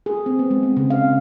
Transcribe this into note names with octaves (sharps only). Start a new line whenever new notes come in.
G#4
C4
B3
G#3
C4
C#3
F5
C4